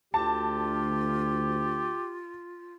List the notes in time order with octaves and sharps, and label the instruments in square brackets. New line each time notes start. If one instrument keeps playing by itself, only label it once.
[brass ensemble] D2 [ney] F4 [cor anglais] G4 [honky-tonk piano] A5